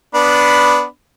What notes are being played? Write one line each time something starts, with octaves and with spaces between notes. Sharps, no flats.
B3 D4 B5